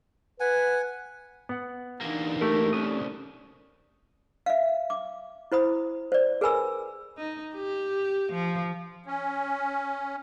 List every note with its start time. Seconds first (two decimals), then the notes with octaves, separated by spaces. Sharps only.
0.40 B4 F#5 G#5
1.49 B3 F#5
2.01 E2 A#3 D4 D#4
2.41 A3 G4 A#4
2.73 C2 C#4 D#6
4.46 E5 F5
4.90 D6
5.52 E4 C5 B5 D#6
6.12 C5 D5
6.41 G#4 A#4 B4 G#5 B5 E6
7.17 D#4
7.54 G4
8.32 F3
9.06 C#4